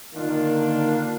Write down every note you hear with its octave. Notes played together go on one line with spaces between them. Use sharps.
D3 D#3 A#3 D4 F4